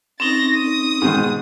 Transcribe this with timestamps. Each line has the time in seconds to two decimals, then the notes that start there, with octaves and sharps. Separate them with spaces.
0.20 C4 C#4 D#4 A6 A#6
0.54 D#6
1.02 G#2 B2 D#3